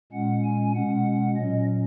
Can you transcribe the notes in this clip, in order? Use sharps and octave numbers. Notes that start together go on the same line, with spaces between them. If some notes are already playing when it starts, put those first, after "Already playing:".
A#2 G#3 C#4 F#5
G#5
B2 G#3 C#4 F#5
A#2 F#3 C#4 D#5